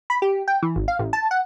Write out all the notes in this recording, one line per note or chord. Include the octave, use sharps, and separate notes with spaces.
B5
G4
G5
E3
G#1
F5
A1
A5
F#5